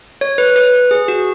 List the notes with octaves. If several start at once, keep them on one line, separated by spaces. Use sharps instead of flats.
C#5
B4
B4
G#4
F#4